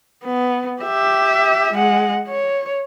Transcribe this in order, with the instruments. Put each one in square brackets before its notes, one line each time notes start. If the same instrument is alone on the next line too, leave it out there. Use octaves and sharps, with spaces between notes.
[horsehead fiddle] B3
G4 E5
G#3 F#5
C#5